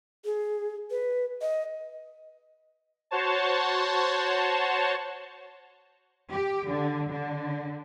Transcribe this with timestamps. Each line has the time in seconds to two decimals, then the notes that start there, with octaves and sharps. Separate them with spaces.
0.25 G#4
0.91 B4
1.42 D#5
3.11 F#4 C5 C#5 A5
6.31 G4
6.67 D3
7.11 D3